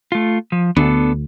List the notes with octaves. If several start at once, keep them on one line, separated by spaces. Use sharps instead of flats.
A3 F4
F3
D2 B3 D4 A4